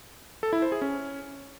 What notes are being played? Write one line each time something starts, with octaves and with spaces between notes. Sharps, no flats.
A4
E4
C5
G#4
C#4